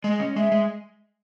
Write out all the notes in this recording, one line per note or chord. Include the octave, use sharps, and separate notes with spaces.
G#3 D#5
C#4
G#3 E5
G#3